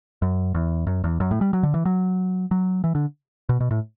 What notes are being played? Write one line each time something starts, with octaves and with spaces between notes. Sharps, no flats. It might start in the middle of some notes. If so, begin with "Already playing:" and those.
F#2
E2
F#2
E2
F#2
A2
G3
F#3
D3
E3
F#3
F#3
E3
D3
B2
B2
A2